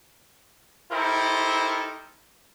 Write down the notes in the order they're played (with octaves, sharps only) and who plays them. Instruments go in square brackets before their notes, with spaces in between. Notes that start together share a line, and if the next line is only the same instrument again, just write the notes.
[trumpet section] D#4 E4 G4 A4 A#4 C5